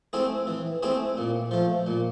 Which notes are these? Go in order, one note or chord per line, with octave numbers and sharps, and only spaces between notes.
A3 C4 E4 G#4
E3
A3 C4 E4 G#4
A#2
F3 A3
A#2